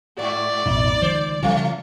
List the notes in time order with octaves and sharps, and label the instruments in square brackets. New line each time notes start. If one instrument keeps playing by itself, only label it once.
[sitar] G#2 [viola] D5
[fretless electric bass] A1 F2 B2 [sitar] D#4
[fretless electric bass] C#2 D#3 F3 [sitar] C5
[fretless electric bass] C#3 G3 [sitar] E3 A3